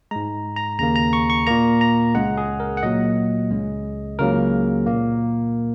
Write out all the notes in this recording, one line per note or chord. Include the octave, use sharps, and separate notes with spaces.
G#2 G#3 A#5
A#5
D#2 C#3 A#3 A#5
A#5
C#6
C#6
A#2 A#3 A#5
A#5
C#2 C#3 G#3 F#5
G#4
A#4
F#5
A#2 F#3 A#3 D#5
C#2 C#3 G#3
C#2 C#3 F#3 A#3 A#4
A#2 A#3